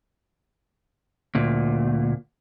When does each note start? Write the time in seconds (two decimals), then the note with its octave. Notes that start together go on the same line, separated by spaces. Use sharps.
1.35 D2 A#2